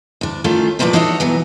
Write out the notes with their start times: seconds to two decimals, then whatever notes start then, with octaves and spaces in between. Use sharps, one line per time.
0.21 D2 D4
0.44 D#3 A3 C#4 F4
0.79 A#2 D#3 F3 A3 B4 D5
0.93 D4 D#4 F#4 C#5 D#5 E5
1.20 B2 E3 F#3 B3